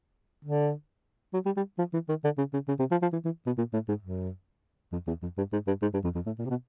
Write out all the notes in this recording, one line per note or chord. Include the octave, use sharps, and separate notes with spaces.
D3
F#3
G3
G3
F3
E3
D#3
D3
C#3
C#3
C#3
C3
F3
F3
E3
E3
B2
A#2
A2
G#2
F#2
F2
E2
F2
G2
G#2
G2
G#2
G2
F2
F2
A2
A#2
C3
B2